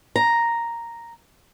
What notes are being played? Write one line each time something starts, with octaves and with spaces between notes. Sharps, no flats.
A#5